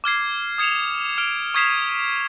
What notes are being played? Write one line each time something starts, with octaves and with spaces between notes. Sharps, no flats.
D6 F6 G#6 C7
D#6 G#6 C#7 E7 F7
F6 D7 F7
C#6 D#6 G#6 B6 C7 E7